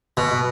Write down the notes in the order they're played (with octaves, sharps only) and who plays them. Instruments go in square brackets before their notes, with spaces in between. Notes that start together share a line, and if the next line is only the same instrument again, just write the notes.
[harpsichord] B2